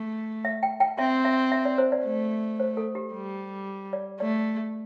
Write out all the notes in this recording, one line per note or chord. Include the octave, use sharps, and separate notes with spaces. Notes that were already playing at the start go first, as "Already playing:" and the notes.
Already playing: A3
E5
G5
G5
C4 E5
E5
E5
D5
C5
D5
A3
C5
A4
G4
G3
D5
A3 D5